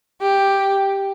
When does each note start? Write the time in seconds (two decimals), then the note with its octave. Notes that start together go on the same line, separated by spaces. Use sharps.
0.22 G4